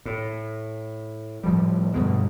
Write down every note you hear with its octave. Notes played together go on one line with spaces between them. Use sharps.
A2
A2 F3 G3
G2 B2 D3 G#3